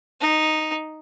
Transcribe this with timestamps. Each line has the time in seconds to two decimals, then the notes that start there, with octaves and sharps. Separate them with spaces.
0.21 D#4